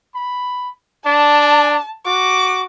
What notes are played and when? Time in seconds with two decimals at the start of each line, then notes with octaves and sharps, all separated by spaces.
0.15 B5
1.06 D4 A5
2.06 F#4 D6